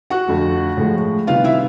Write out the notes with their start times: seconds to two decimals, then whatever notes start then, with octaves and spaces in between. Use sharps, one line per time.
0.10 F#4 F#5
0.27 F2 D3 F3 A3
0.77 A2 F3 G#3
1.27 C3 D#3 G3 B3 F4 F5
1.44 E4 E5